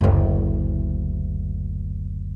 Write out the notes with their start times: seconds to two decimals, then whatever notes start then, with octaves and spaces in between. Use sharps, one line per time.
0.01 F#1 D2